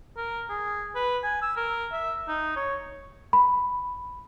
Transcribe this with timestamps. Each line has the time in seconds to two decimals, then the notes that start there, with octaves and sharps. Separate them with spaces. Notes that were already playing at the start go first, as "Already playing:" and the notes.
0.17 A#4
0.49 G#4
0.95 B4
1.23 G#5
1.42 E6
1.57 A#4
1.92 E5
2.28 D#4
2.56 C#5
3.33 B5